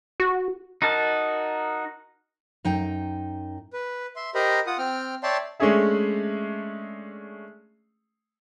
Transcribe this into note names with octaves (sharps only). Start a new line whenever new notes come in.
F#4
D#4 F#4 A#4 A5
F#2 D#4 G5
B4
E5 C6
G4 A#4 C5 D#5 A#5 B5
F4 F#5 D#6
C4 G5 F6
C#5 D5 E5 G5 A5 C6
G#3 A3 C#4 D4 G#4 E5